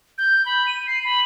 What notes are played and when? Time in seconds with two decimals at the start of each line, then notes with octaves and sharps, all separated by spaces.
0.18 G6
0.46 B5
0.67 D#7
0.87 C7
1.04 B5